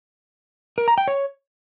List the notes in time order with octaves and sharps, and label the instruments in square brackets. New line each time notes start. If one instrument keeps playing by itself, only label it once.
[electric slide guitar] A#4
A#5
G5
C#5